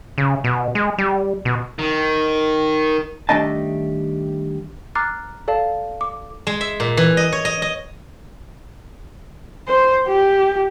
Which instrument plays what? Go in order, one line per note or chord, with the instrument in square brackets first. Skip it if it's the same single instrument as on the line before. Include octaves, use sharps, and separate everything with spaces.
[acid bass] C#3
B2
G#3
G3
B2
[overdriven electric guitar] D#3
[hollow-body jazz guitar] D#3 G3 A3 D4 D#5 A5
[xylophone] A#5 D6 F6 F#6 A6 C7
A4 D5 F5 A5
D6
[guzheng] G#3
E5
A#2
E3
D#5
C#5
D#5
D#5
[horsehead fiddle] C5
G4